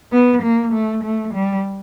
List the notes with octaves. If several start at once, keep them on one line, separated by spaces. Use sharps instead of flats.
B3
A#3
A3
A3
G3